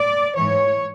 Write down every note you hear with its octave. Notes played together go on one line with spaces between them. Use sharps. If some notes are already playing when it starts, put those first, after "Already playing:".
Already playing: D5
G#2 E3 C#5